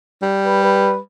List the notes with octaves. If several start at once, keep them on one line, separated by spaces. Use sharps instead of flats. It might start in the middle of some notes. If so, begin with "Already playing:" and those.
G3
B4
B4